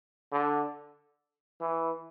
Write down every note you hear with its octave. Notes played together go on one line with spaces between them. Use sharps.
D3
E3